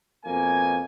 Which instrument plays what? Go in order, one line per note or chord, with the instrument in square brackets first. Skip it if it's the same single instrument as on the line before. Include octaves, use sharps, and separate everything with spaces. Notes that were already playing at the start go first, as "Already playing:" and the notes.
[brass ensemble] F2 B2 A#3 G#5